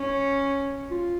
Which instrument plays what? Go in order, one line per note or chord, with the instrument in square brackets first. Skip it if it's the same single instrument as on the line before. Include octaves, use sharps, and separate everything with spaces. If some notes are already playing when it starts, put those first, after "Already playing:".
Already playing: [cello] C#4
[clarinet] F4